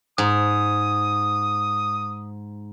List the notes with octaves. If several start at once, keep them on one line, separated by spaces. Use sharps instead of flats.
G#2 D#6